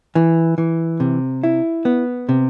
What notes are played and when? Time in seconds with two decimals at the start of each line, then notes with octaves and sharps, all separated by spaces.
0.15 E3
0.58 E3
1.00 C3
1.43 E4
1.85 B3
2.29 C3